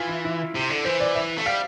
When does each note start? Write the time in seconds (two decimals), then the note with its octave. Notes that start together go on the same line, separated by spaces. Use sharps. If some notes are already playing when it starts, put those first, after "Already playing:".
Already playing: E3 F4
0.09 E4
0.25 E4
0.55 C3
0.70 D3
0.85 E3 C5
1.00 D5
1.15 E5
1.38 A3
1.46 G3 F5